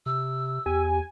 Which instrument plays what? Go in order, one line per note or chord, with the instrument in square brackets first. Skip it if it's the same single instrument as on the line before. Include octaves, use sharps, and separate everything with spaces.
[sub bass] C3 [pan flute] E6
[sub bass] E2 [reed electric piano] G4 [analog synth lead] G#5